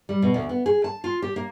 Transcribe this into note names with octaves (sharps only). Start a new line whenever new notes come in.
G3
B2
D2
B3
G#4
A5
F4
G4
A#3